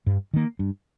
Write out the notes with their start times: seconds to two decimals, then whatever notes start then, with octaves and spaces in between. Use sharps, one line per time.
0.07 G2
0.34 D#3 A#3
0.59 G2